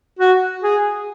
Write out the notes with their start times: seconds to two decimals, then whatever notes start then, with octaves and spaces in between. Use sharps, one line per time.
0.19 F#4
0.63 G#4